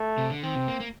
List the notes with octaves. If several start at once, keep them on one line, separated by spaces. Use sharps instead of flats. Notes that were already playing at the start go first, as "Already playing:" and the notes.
Already playing: A3
C3
D3
D#3 C4
C3
A#3
A#3